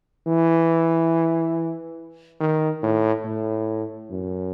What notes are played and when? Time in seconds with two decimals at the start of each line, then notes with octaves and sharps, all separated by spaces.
0.27 E3
2.40 D#3
2.83 A2
3.25 A2
4.10 F#2